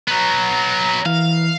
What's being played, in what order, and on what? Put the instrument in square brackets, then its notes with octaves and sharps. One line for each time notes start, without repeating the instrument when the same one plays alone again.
[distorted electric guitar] F#3 B3 [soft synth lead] A#5
[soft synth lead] E3 [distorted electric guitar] F5